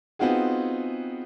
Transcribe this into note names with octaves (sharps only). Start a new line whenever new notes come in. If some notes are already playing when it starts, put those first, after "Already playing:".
B3 C4 D#4 F4 F#4 G#4